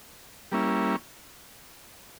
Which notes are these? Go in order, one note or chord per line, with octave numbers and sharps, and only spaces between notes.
G3 A#3 C#4 E4